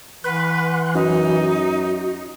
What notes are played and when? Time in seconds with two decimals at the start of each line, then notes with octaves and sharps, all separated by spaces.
0.24 E3 B4 F#5 C6 F#6
0.95 F#2 D#4 F#4